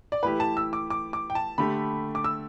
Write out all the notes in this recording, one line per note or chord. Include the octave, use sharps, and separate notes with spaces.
D5
E3 A3 E4 G4 B4
A5
E6
D6
D6
D6
G5
A5
D3 A3 G4 B5
D6
E6